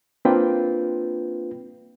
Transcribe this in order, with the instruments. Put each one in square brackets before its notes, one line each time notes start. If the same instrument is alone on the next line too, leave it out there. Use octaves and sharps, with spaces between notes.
[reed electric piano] A#3 C4 D4 F4 B4 G5